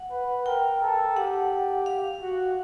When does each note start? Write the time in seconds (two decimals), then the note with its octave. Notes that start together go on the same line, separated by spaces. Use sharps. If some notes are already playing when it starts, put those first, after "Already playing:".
Already playing: F#5
0.11 B4
0.46 A#4 G5
0.81 A4
1.16 G4 F#5
1.86 F5
2.21 F#4